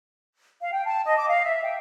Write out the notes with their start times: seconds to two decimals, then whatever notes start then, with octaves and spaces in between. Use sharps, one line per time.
0.61 F5
0.73 G5
0.86 A5
1.05 D#5
1.17 D6
1.28 F5
1.46 E5
1.63 G5